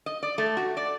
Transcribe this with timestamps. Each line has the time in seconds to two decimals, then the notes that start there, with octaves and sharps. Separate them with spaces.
0.06 D#5
0.23 D5
0.38 A3
0.57 F#4
0.77 D5